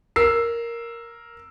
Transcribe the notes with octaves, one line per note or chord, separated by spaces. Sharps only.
A#4 E6 C7